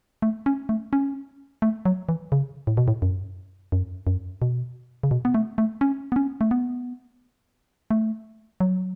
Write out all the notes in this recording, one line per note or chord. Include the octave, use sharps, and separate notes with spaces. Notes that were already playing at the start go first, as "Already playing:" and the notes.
A3
C#4
A3
C#4
A3
F#3
E3
C#3
A2
B2
A2
F#2
F#2
F#2
B2
C#3
B2
B3
A3
A3
C#4
B3
C#4
A3
B3
A3
F#3